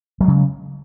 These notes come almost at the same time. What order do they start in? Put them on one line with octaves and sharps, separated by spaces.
F#3 G#3 C#3